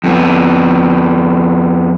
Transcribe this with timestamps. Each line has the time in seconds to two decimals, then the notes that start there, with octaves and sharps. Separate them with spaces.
0.04 F2 B3